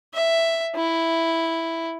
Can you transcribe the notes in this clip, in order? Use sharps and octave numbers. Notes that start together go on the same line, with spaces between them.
E5
E4